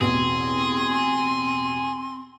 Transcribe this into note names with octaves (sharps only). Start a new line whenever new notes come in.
A1 E2 B2 C4 G#4 C6